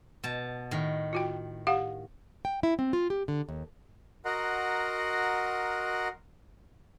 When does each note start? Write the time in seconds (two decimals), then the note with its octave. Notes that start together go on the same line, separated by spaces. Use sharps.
0.24 B2 A5
0.71 A2 D#3
1.13 F4 F#4 G5
1.67 G4 F5 F#5
2.45 G5
2.63 E4
2.79 C4
2.93 F4
3.10 G4
3.28 D3
3.49 D#2
4.25 F#4 A#4 D#5 F#5 A#5 C6